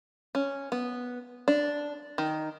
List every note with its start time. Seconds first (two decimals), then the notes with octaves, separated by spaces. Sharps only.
0.35 C#4
0.72 B3
1.48 D4
2.18 D#3